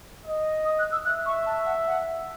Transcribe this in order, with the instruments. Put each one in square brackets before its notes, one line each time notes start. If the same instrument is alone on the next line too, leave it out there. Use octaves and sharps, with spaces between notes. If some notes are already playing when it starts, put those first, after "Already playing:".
[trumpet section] D#5
[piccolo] D#6
F#6
E6
[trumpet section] E5 [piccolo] F#6
[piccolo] C#6
A5
F#5
F#5